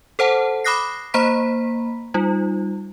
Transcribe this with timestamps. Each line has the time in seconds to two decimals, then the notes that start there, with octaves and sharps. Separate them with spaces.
0.19 A4 C5 F#5 A5
0.64 B5 D6 D#6 F#6 A#6 C7
1.14 A#3 C5 A#5 B5 B6
2.14 G3 D#4 F4